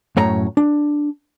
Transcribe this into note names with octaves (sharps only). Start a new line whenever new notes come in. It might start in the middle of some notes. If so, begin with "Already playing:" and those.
F#2 A2 C#5 A#5
D4